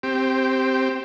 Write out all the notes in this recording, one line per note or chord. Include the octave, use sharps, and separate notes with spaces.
C4 G4